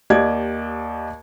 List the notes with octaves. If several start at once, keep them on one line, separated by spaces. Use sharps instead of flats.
D#2 G4 D5 D#5 G#6